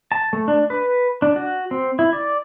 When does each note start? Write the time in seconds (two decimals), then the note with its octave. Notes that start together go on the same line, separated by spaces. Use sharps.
0.12 A5
0.33 A3
0.48 D4
0.70 B4
1.22 D4
1.36 F#4
1.71 C4
1.99 E4
2.13 D5